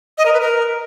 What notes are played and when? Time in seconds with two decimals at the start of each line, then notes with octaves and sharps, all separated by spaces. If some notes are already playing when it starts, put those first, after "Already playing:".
0.18 D#5
0.26 A#4
0.33 B4
0.41 A#4